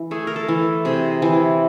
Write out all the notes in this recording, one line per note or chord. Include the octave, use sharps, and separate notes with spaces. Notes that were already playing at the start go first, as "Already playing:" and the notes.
Already playing: E3
A3 G#4
A#4
A4
E3
C3 G#4
E3